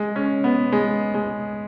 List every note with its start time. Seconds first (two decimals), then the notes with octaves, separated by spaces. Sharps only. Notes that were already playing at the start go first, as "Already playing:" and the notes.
Already playing: G#3
0.16 C#4
0.44 B3
0.72 G#3
1.14 G#3